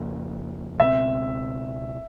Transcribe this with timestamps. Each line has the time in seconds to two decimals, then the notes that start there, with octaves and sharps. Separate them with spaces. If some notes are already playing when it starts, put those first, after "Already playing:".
Already playing: F2 C#3 F3 A#3
0.79 C#2 B2 G#3 C4 E5